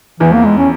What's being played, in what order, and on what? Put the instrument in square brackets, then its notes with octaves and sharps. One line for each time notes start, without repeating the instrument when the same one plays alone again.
[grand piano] E2 [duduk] E3
[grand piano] F2 [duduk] A#3
[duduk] G#3
C#4